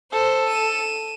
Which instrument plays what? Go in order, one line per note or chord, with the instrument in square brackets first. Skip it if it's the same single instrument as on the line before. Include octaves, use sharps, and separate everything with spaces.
[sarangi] A4 [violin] C5
[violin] D#7 E7